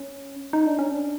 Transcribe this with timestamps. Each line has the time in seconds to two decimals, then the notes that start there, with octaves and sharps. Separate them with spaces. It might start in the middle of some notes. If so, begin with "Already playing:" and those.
Already playing: C#4
0.53 D#4
0.66 D4
0.79 C#4
0.92 D4